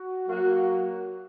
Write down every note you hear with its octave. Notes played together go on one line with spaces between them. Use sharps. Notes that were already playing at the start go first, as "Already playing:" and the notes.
Already playing: F#4
F#3 A#3 F#4